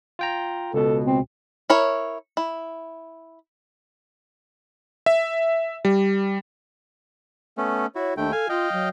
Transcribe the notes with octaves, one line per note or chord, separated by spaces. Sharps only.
F4 G5 A#5
C#2 B2 A4
C4
E4 A#4 C#5
E4
E5
G3
A3 B3 C#4
E4 F#4 C#5
D#2 A3 D4 G5
A4 F5 G#5
F4 D#5 F5 G5
F#3